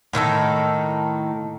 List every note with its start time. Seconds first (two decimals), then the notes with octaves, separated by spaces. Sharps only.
0.13 A2 D#3 A#3 A4